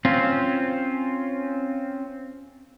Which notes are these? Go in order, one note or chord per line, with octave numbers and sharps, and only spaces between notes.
C4 C#4 F4